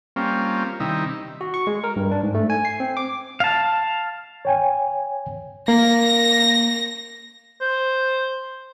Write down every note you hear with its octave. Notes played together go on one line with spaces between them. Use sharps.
G3 A#3 C4 C#4 F4
C3 D#3 G3 D#4 E4
F#4
C#6
G#3
A#4
G2
D4
G#2
A3
G#5
C7
C4
D6
F5 A5
C#5 G5 G#5
A#3 A#6
C5